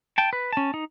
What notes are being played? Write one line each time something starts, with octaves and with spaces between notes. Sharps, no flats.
G5 A5
B4
C#4 A5
D#4